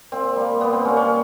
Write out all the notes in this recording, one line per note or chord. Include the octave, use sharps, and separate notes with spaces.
A#2 C4
G3 A#3
A#2 B3
C4
G3 A#3 C#4
C#4